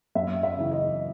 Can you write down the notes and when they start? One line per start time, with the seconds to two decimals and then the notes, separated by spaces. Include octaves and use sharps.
0.15 F#2 E5
0.43 E5
0.57 C#3 E3
0.71 D#5